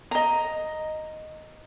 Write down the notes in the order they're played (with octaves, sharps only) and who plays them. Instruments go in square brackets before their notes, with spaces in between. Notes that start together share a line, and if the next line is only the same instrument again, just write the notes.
[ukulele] D#5 A#5